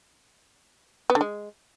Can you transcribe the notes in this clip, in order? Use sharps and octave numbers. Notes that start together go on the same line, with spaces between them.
B3
D3
G#3